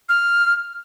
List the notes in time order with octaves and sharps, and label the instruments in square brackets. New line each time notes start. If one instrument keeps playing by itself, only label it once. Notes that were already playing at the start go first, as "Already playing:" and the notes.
[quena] F6